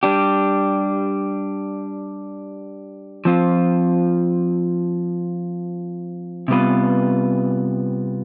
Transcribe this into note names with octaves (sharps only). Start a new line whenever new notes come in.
G3 D4 G4
F3 C4 F4
C3 G3 B3 F4 B4